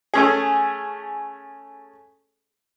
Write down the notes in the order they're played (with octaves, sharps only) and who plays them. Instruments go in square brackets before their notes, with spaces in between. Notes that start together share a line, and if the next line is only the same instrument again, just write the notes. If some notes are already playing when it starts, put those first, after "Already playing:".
[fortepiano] A3 C#4 G#4